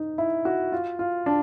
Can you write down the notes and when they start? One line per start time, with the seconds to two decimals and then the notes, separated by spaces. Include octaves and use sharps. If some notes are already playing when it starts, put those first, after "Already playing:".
Already playing: D#4
0.18 E4
0.45 F#4
0.72 F4
0.99 F4
1.26 D4